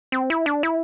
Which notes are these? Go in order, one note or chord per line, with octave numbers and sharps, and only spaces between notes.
C4
E4
D4
E4